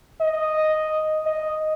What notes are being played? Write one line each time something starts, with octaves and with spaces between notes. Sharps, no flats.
D#5
D#5